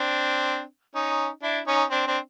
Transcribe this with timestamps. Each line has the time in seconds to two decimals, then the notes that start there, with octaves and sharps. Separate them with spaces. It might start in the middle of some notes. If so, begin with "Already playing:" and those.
Already playing: C4 D4
0.95 C#4 D#4
1.43 D4 E4
1.67 C#4 D#4
1.91 C4 D4
2.07 C4 D4